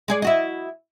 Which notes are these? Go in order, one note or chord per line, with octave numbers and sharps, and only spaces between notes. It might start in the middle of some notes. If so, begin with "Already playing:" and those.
G#3 G#4 D5
E4 F#4 D#5